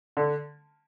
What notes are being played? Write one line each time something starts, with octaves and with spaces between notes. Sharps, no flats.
D3